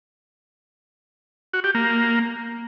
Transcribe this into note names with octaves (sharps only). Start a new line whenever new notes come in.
F#4
G4
A#3